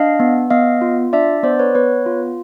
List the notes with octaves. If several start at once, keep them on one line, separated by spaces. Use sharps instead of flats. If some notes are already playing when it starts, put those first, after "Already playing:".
Already playing: D4 D#5 F5
B3
B3 D#5 F5
F4
D4 D5 E5
B3 C5 D5
B4 C#5
B3 B4 C#5
F4